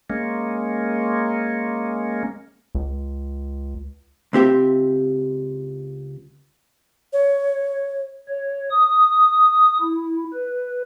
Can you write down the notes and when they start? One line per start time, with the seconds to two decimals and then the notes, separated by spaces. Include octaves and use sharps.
0.10 G#3 A#3 C#4
2.75 C#2
4.33 C#2 C4 G4 E5
7.13 C#5
8.28 C#5
8.71 D#6
9.81 E4
10.33 B4